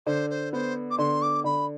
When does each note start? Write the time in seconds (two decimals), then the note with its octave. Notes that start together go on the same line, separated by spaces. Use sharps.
0.06 D3 C5
0.30 C5
0.53 B3 C5
0.90 D6
0.98 D3 C6
1.22 D6
1.44 D3 B5